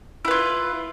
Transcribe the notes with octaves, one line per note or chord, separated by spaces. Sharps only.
E4 F4 B4